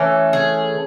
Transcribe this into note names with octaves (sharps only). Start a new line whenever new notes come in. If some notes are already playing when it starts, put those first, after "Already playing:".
Already playing: E3 A3 C#4
G#4